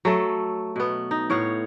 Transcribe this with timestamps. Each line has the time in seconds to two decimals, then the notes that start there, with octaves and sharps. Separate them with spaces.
0.05 F#3 A3 A4
0.76 B2 B3
1.11 D#4
1.30 A2 C#5 F5 F#5